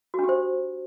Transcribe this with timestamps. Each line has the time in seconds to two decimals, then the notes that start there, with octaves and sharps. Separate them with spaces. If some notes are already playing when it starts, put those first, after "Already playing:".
0.14 F#4
0.19 D4
0.24 G4
0.29 C5